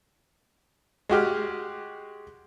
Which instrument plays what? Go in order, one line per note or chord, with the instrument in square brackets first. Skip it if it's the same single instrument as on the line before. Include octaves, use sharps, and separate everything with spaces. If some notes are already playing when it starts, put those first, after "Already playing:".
[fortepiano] G#3 F#4 G4 F6